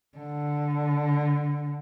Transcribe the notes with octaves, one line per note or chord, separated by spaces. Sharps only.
D3